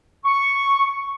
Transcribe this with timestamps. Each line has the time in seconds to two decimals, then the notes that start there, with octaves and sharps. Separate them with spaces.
0.24 C#6